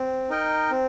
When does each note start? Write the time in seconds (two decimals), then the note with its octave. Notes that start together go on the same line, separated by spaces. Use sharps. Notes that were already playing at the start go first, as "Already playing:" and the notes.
Already playing: C4
0.30 D#4 A#4 D#5 G5
0.71 C4